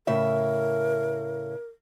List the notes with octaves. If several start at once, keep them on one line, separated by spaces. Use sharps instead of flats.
A2 C#3 A#4 E5